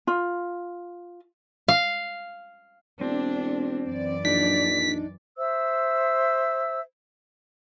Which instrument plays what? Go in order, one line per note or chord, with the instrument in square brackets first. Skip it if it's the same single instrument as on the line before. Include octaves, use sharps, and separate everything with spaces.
[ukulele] F4
[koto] F5
[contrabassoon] E1 [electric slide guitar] C4 [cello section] D4
[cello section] F#2 E3 D5
[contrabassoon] A#1 [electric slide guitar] D4 D#4 [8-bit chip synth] B6
[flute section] C5 E5 E6